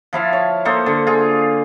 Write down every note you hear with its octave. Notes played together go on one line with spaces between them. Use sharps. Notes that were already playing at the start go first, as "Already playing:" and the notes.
F3 E4 F5 A5
C#5
A#3 D#4 A4 C5
D3
F4 G#4